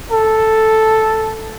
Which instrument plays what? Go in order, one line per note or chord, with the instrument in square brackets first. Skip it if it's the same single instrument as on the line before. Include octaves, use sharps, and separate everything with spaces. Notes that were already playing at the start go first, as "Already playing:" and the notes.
[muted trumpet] A4